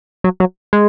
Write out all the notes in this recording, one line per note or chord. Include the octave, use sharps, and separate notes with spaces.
F#3
F#3
G#3